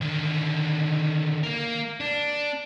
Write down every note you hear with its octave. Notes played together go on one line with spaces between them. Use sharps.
D3 D#3
A#3 A#4
D4